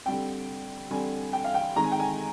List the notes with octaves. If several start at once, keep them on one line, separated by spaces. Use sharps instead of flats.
D3 G3 C4 G5
D3 G3 C4 G#5
G5
F5
G5
D#3 G#3 C4 A#5
G#5
G5
G#5